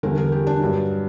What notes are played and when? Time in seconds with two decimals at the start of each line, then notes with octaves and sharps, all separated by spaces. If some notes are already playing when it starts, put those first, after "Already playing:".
0.03 E2 D3 G3 A#4
0.18 A#4
0.32 G4
0.47 D4
0.60 G2 F#3